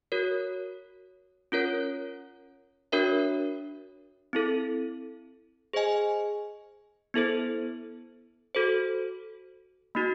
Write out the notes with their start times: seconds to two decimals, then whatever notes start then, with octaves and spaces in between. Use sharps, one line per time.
0.12 F#4 A#4 C#5
1.52 C#4 F4 A#4 C#5
2.92 D4 F#4 A#4 C#5 E5
4.33 C4 E4 A4
5.73 G#4 C5 D#5 G#5
7.14 B3 E4 A4 C5
8.55 F#4 A4 C5
9.95 A#3 D#4 F#4